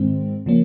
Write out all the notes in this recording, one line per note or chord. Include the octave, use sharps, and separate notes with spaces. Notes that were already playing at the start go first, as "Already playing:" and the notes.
Already playing: G#2 D#3 G#3 C4
C#3 F3 A#3 C#4